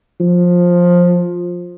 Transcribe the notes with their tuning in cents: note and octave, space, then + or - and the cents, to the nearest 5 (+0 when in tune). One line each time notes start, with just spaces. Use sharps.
F3 +15